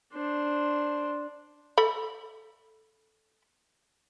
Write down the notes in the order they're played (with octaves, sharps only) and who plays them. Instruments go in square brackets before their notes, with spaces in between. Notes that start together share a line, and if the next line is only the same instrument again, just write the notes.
[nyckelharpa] D4 C5
[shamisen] A4 B5